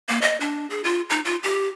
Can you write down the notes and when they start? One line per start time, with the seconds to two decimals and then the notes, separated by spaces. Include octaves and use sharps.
0.09 A#3
0.22 D#5
0.40 D4
0.70 G#4
0.84 F4
1.10 D#4
1.25 F4
1.43 G4